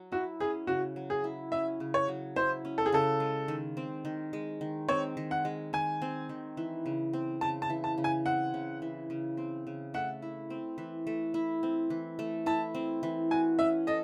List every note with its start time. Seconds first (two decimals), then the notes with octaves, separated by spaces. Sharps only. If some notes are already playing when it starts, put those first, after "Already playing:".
Already playing: F#3
0.12 E4 F#4
0.40 C#4 G#4
0.67 C#3 F#4
0.96 F#3
1.10 G#4
1.24 E4
1.52 C#4 E5
1.80 C#3
1.94 C#5
2.08 F#3
2.36 E4 C5
2.65 C#4
2.78 A4
2.86 G#4
2.92 C#3 A4
3.20 G#3
3.48 D#3
3.77 C4
4.05 D#3
4.33 G#3
4.61 D#3
4.88 C4 C#5
5.17 D#3
5.31 F#5
5.45 G#3
5.73 D#3 G#5
6.02 C4
6.29 D#3
6.57 E3
6.86 C#3
7.13 C4
7.41 C#3 A5
7.62 A5
7.70 E3
7.84 A5
7.98 C#3
8.04 G#5
8.26 C4 F#5
8.54 C#3
8.82 E3
9.10 C#3
9.37 C4
9.67 C#3
9.94 A3 F#5
10.22 E4
10.50 C4
10.78 E3
11.07 A3
11.34 E4
11.63 C4
11.90 E3
12.19 A3
12.46 E4 A5
12.75 C4
13.03 E3
13.31 F#4 G#5
13.59 C#4 E5
13.87 A4 D#5